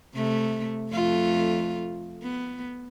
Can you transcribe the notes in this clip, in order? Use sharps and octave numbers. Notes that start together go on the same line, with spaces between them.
C3 A3
F2 A3 F4
B3